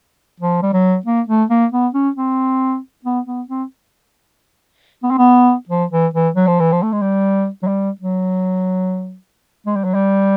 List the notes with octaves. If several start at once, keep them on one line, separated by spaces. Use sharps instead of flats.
F3
G3
F#3
A#3
A3
A#3
B3
C#4
C4
B3
B3
C4
B3
C4
B3
F3
E3
E3
F#3
F3
E3
F3
A3
G#3
G3
F#3
G3
F#3
G#3
G3
F#3
G3